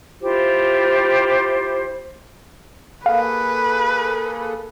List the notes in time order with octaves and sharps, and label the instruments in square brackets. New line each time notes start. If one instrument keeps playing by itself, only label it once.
[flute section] E4 F4 G4 C5
[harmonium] A#3 G#4 A4 [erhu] B4 [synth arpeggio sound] F5